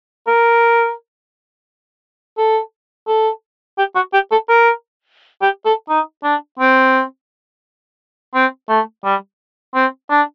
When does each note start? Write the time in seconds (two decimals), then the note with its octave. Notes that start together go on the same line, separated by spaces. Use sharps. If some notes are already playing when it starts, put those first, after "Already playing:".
0.28 A#4
2.38 A4
3.08 A4
3.78 G4
3.96 F#4
4.14 G4
4.31 A4
4.49 A#4
5.42 G4
5.66 A4
5.89 D#4
6.24 D4
6.59 C4
8.35 C4
8.69 A3
9.05 G3
9.75 C4
10.11 D4